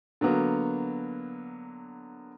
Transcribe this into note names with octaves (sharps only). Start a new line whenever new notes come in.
D3 F#3 A#3 B3